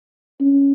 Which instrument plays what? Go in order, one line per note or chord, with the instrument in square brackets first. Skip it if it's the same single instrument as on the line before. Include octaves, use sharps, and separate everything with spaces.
[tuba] C#4